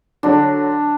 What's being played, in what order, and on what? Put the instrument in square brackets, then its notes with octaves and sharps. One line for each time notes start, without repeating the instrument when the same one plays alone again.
[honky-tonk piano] D3 F#3 [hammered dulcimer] D4